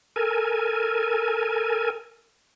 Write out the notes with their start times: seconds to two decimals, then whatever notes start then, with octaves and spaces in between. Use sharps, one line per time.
0.16 A4 A#4 G#5